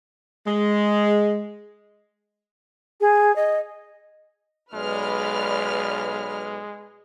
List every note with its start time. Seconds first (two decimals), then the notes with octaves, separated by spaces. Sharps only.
0.46 G#3
3.01 G#4
3.36 D#5
4.73 B1 G#3 B4 D5 F6